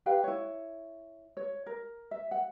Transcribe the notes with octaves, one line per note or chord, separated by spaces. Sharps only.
G4 B4 F5 G5
E4 C#5
C#5
A#4
E5
F#5